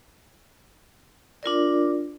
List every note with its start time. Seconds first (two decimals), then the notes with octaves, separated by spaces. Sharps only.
1.43 D4 F4 A#4 D5